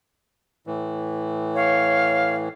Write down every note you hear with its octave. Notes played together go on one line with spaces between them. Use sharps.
A2 E3
C#5 F5